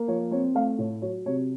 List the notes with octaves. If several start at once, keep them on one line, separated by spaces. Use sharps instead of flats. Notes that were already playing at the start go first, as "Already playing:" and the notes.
Already playing: A#3
F3 C#5
C4 C#5
A3 F5
A2 C#5
F#3 C#5
C3 C#5